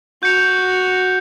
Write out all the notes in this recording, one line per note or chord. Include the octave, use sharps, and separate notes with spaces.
F#4 G6 C#7 F7